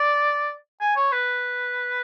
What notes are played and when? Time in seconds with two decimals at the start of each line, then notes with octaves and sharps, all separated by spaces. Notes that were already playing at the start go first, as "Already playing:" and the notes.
Already playing: D5
0.81 G#5
0.96 C#5
1.12 B4